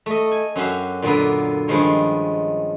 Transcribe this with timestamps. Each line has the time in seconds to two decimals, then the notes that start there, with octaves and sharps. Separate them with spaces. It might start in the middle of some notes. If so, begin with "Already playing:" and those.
0.06 A3 D#5
0.31 G#5
0.56 F#2 C#4 F#4 G4 E5 F5
1.02 A#2 D3 F#3 A#3 B3
1.68 G2 D#3 F3 G#3 C#4 C#5